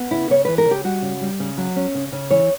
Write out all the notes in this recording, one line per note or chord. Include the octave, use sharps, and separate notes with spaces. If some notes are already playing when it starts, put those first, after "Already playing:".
Already playing: B3
C#3 E4
C#3 C#5
E3 B4
A#4
C#3
G4
G3 F#4
C#3
G3
C#3
F#3
C#4
C#3
C#3
E3 C#5